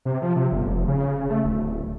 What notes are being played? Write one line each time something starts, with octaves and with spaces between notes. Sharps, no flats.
C3
F3
C3
G1
F1
C#3
A3
D1